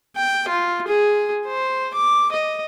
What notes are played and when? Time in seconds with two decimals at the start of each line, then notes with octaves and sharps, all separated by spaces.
0.16 G5
0.49 F4
0.88 G#4
1.47 C5
1.94 D6
2.32 D#5